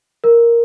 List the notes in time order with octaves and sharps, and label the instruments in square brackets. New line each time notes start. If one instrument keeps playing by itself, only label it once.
[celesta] A#4